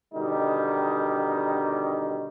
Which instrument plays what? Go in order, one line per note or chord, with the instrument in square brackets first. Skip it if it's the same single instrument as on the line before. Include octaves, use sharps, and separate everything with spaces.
[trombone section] B2 D3 D#3 G3 D#4